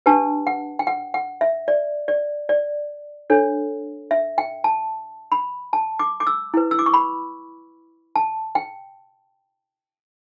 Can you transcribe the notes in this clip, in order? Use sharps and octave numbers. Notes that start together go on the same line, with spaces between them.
D4 G4 B4 A5
F#5
G5
F#5
F#5
E5
D5
D5
D5
D4 A4 C#5
E5
G5
A5
B5
A5
D6
D6
E6
E4 B4
E6
D6
C#6
B5
A5
G5